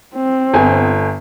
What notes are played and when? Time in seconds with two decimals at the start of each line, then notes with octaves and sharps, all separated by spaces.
0.16 C4
0.54 G1 G#5